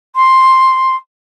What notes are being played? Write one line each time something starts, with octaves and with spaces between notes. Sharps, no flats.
C6